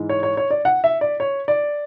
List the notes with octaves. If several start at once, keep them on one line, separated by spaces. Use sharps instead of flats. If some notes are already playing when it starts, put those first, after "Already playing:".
Already playing: G#2 E3 G#3
C#5
C#5
C#5
D5
F#5
E5
D5
C#5
D5